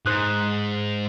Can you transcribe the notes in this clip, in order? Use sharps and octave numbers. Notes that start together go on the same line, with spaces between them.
G#2 C5 D#6 F#6